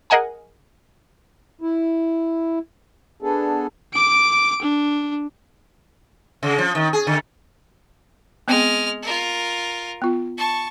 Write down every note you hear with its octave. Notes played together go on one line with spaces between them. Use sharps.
G#4 A#4 D#5 F#5 G#5 A#5
E4
B3 D4 G#4 A4
D6 D7
D4
C#3
F3
D#3
G#4
D3
G#3 B3 C4 F6
F4 A#4
B3 F4
A5 C#6